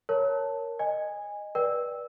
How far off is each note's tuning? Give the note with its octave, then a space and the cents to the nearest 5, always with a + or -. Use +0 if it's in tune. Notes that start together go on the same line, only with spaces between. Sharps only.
A#4 +0 C#5 +0 A5 +0
D#5 -10 G#5 -20
B4 -25 D5 +5 G5 +0